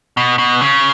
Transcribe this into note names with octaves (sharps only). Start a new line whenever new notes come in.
B2
B2
C#3